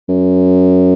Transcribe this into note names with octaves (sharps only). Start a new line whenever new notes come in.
F#2